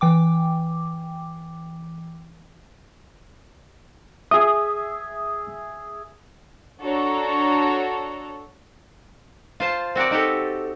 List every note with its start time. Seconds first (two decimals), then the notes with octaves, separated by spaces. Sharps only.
0.01 E3 G5 D6
4.31 G#4 E5 D#6
6.81 D4 F#4 A4 C#5 A#5
9.60 F4 C5 A5
9.95 C4 F#4 A#4 D5
10.11 D#4 F#4 G4 A4